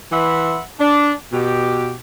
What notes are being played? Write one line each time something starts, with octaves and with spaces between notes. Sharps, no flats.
E3 B4 E5 F#5 B5 C6
D4
B2 G4